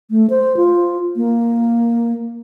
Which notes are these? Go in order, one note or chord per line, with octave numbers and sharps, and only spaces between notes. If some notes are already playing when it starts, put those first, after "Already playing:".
A3
C5
F4
A#3